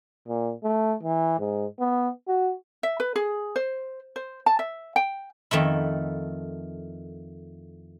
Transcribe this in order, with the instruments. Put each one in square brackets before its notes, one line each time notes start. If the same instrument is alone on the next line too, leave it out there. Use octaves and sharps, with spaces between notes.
[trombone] A#2
A3
E3
G#2
B3
F#4
[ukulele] E5
B4
G#4
C5
C5
A5
E5
G5
[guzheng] F2 D#3 A3 E4